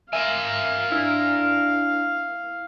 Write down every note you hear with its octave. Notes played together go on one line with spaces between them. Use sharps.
A#4 E5 F5 G#5
D4 E4